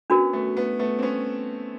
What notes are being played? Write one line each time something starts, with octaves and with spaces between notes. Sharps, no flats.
B3 C#4 D4 F#4 A#4
A3 B3
A3 B3
A3 B3
C4
B3 C#4